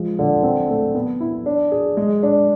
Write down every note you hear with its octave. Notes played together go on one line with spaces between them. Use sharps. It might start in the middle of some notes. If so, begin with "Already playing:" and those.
Already playing: F3 G#3
D3
C4
A3
B3
E4
D4
G#4
G#3
D4